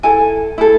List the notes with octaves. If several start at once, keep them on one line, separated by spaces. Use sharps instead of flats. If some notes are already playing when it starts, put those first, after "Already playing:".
E4 A4 G#5
E4 A4